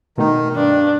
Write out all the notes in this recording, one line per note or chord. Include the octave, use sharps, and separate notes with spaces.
B2 D#3 A3 D#4
G2 D4